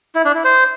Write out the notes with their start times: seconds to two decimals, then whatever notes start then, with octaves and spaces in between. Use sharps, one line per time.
0.15 E4
0.25 D4
0.35 E4
0.44 C5